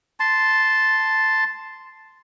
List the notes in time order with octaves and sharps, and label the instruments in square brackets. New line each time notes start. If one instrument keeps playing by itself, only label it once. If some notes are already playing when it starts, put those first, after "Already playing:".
[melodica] A5 C6